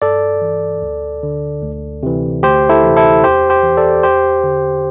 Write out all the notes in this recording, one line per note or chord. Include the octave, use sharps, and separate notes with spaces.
G2 A4 D5
E3
D2
D3
D2
C3 E3
D2 G4 C5
E4 A4
C3 E3
E4 A4
E2 G4 C5
G4 C5
E3
A4 D5
E2 G4 C5
D3